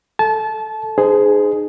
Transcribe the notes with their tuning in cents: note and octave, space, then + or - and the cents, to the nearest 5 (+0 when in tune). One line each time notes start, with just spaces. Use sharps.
A4 +0 A5 -25
D#4 -30 G#4 +5 C5 -30